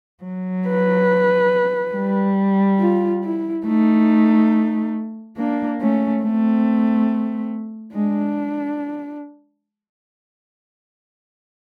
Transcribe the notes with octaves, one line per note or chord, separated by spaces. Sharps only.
F#3
B4
G3
F4
E4
A3 D#4
A#3 D4
A3 C#4
A3 C4
G#3 D4